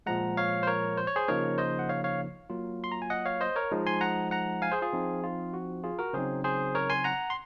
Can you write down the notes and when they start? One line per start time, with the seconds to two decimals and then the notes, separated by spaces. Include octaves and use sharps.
0.06 A#2 F3 G#3 F#5 A#5
0.37 C#5 F5
0.63 C5
0.67 A#4 C#5
0.97 C5
1.07 C#5
1.16 G#4 C5
1.28 C#3 F3 A#3 D#4 A#4 C#5
1.58 C5 D#5
1.79 F#5
1.89 C#5 F5
2.04 C#5 F5
2.50 F#3 A#3 F4
2.84 C6
2.92 A#5
3.02 G#5
3.10 D#5 F#5
3.25 C#5 F5
3.41 C5 D#5
3.56 A#4 C#5
3.72 F3 G#3 D#4
3.87 G#5 C6
4.01 F#5 A#5
4.31 F#5 A#5
4.62 F5 G#5
4.72 G#4 C5
4.82 F4 G#4
4.93 F3 C4 D#4
5.23 F4
5.54 F#4
5.84 F4 G#4
5.99 F#4 A#4
6.13 C#3 F#3 C4 D#4 G#4 C5
6.44 G#4 C5
6.75 A#4 C#5
6.90 G#5 C6
7.04 F#5 A#5
7.30 C6